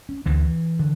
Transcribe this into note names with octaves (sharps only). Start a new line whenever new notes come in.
C#4
D2 D3 E3
D3